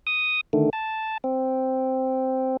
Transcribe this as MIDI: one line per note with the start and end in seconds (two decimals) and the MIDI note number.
0.07 0.41 87
0.53 0.70 50
0.53 0.70 51
0.53 0.70 57
0.73 1.18 81
1.24 2.57 60